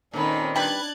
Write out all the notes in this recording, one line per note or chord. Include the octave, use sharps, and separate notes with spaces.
A#2 D#3 C4 C#4 D#4 A4 B5
G3 D4 B4 F#6 G#6 A6